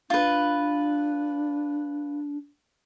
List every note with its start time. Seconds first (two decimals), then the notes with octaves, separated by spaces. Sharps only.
0.10 D4 F4 B4